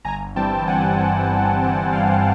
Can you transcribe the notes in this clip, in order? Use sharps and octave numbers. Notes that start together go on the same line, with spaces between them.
G1 G#5 A#5
G2 E3 G3 C4 G5 A5
G1 F#5 G#5
G2 E3 G3 C4
G1
G2 E3 G3 C4
G1 F5 G5